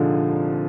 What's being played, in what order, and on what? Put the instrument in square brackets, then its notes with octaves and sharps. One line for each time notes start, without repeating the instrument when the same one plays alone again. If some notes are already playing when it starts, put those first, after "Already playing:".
Already playing: [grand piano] C2 A#2 G#3 D#4 [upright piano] D3 F3